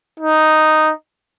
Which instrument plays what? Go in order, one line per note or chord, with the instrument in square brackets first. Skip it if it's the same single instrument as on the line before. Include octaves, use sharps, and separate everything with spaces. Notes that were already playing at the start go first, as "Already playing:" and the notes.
[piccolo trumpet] D#4